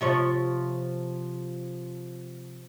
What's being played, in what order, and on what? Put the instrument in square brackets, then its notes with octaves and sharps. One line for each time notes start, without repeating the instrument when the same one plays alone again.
[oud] C3 F3 C#5